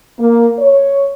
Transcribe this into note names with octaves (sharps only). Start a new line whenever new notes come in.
A#3
C#5